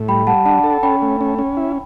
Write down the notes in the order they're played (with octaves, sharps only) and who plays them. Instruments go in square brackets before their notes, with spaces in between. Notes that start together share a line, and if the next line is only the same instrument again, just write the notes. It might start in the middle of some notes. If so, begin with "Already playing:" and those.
Already playing: [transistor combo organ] A2
[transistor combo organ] G3 [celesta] G5 B5
[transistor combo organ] G3 [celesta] F#5 A5
[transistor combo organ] D4 [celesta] F#5 A5
[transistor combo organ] A4
[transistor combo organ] C#4 [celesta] G5 B5
[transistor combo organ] A3
C#4
C#4
E4